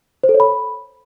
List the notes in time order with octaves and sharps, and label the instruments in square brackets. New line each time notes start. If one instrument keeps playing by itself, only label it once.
[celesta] C5
A4
C#5
B5